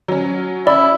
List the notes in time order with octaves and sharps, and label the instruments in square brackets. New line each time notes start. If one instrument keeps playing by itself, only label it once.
[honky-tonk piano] F#3 C#4
[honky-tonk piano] C#4 B5 [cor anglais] E4 [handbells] D5